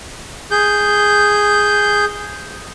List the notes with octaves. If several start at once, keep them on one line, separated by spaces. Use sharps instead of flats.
G#4 G6